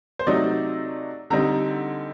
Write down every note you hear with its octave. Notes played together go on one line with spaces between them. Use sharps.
C5
C3 F#3 A3 D#4 D5
D3 G3 C4 D#4 A#5